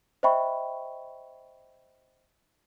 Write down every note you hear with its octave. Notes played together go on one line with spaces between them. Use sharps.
C5 D#5 E5 G5 B5 C#6